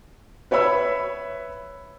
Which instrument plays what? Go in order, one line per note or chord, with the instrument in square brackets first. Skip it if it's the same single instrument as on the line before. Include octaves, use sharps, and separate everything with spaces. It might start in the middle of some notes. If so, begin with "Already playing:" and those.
[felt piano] B4 C#5 E5 B5 E6